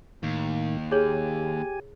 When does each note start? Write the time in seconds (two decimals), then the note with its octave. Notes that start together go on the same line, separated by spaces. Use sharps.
0.23 D#2 A2 D#3
0.91 G4 G#4 C#5 G#5